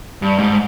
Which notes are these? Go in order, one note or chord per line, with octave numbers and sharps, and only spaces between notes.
G2
G#2